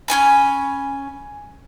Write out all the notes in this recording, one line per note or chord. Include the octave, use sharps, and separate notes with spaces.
C#4 F4 G#5 B5